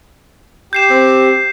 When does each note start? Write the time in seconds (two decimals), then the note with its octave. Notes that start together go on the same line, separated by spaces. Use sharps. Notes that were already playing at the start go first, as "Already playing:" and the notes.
0.73 G4 G6 C7 E7
0.90 C4